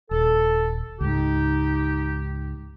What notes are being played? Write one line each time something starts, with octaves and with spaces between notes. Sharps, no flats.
D#1 A4
C#2 G#2 D#4 G4